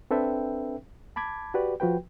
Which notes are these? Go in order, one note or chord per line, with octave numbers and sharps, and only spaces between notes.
C4 D4 A4 B4 E5 G5
A5 B5 D6 G#6
F#4 G4 B4 D5
F3 F#4 B4 G5